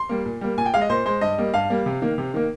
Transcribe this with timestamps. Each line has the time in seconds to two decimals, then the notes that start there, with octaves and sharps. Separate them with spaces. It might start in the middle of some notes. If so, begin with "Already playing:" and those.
Already playing: C6
0.09 G3 A#3
0.25 A#2
0.41 G3 A#3
0.57 A#2 G#5
0.66 G5
0.74 G#3 F5
0.81 D#5
0.89 A#2 C5
1.06 G#3 C5
1.21 G2 D#5
1.38 G3 A#3
1.54 G2 F5
1.70 G3 A#3
1.86 C3
2.02 D#3 A#3
2.18 C3
2.34 D#3 A#3